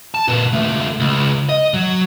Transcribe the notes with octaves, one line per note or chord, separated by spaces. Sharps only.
A5
A#2 B4
C#2 A3
C#2
D#5
F#3